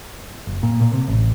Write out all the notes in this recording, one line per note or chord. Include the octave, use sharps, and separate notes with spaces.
F#1
A#2
A#2
C3
A1